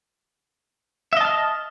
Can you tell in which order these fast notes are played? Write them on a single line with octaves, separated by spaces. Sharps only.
E5 D#5 A5 F6